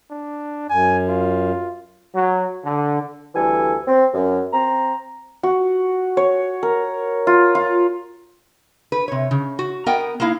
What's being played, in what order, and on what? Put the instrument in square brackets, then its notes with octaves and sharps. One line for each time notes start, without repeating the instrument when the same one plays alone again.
[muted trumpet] D4
[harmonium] F#2 [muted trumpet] G#5
[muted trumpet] F4
[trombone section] F#3
D3
[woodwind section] D2 E3 G3 A4 G#5
C4
F#2
C4 A#5
[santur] F#4
C#5
A#4
F4
F4
[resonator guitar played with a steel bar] B4
C3 C#5
C#3
F#4
B3 A#4 D#5 F#5 G5
A#3 D#4 E4 F5